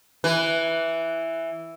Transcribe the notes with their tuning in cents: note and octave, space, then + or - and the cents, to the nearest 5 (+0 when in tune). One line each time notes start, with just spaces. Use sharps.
E3 +0 B4 +0